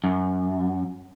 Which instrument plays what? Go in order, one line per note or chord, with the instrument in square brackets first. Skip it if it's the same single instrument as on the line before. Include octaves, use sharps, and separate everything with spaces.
[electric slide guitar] F#2